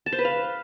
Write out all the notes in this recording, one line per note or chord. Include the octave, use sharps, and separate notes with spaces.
A5
C5
B4
F5